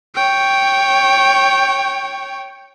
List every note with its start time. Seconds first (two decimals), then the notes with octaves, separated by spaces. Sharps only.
0.15 C#5 G5